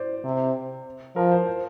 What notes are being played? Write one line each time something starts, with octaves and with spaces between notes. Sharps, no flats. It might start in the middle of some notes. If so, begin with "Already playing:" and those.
Already playing: C5 D5
C3
F3 A#4
C5
C5